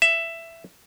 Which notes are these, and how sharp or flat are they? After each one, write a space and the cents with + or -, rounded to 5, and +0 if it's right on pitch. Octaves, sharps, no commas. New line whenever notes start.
E5 +10